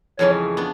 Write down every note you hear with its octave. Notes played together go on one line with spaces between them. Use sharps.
F2 C#3 E3 G#3 C#4 C#5
B3 D4